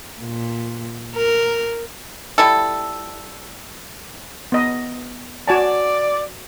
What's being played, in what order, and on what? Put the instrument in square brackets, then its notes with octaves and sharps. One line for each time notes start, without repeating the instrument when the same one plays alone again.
[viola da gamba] A#2
A#4
[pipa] G3 E4 A4
[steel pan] B3 D#5
[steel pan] F#4 G#5 A5 [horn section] D5